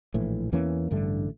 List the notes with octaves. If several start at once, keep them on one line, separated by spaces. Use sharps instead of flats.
A#1 A2 E3
E2 E3 A#3 C#4
A1 G2 D3 A3